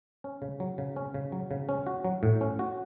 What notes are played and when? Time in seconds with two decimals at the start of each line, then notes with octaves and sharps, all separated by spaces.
0.24 C#4
0.42 C#3
0.60 F#3
0.78 C#3
0.96 C#4
1.14 C#3
1.32 F#3
1.51 C#3
1.69 C#4
1.87 F#4
2.05 F#3
2.23 A2
2.41 C#4
2.59 F#4